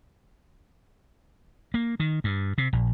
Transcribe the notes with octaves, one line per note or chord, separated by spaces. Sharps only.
A#3
D#3
G2
C3
A#1